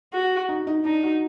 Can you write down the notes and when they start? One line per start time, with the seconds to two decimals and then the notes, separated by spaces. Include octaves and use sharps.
0.13 F#4
0.49 D#4
0.67 D#4
0.85 D4 D#4
1.03 F#4